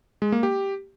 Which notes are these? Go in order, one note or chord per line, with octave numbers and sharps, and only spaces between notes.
G#3
A#3
G4